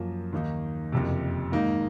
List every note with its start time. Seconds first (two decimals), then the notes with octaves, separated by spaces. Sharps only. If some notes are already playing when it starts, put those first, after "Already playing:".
Already playing: F#2 F3 A#3
0.32 D#2 D#3 A#3 D#4
0.92 F#1 F2 C3
1.52 G#2 D#3 A#3 D#4